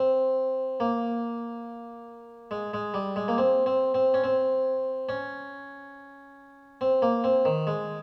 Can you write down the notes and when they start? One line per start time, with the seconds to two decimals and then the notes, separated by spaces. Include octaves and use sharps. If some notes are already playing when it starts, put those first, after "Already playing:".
Already playing: C4
0.80 A#3
2.51 G#3
2.74 G#3
2.94 G3
3.16 G#3
3.28 A#3
3.38 C4
3.66 C4
3.94 C4
4.14 C#4
4.24 C4
5.09 C#4
6.81 C4
7.02 A#3
7.24 C4
7.45 D#3
7.67 G#3